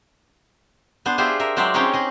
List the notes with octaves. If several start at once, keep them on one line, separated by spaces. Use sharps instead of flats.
B3 D4 C5
F4 G4 G#4 C5 E5
A#4 E5
F#3 G#3 C5 D5 E5 G5
C4 C#4 D#4 G4 G#4 C#5
G#4 D#5